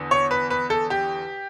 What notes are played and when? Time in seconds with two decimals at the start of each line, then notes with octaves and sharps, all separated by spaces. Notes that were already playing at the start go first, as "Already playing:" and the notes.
Already playing: E2 D3
0.11 C#5
0.31 B4
0.50 B4
0.70 A4
0.90 G4